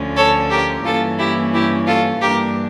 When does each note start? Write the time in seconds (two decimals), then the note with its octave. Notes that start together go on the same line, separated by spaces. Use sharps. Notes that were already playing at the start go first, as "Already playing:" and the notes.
Already playing: D2 D3 F3 C#4
0.17 A4 C#5
0.51 G4 A#4
0.85 G2 E3 A#3 C#4 F4 A4
1.19 E4 G4
1.54 E4 G4
1.87 F4 A4
2.22 G2 E3 A#3 D4 G4 A#4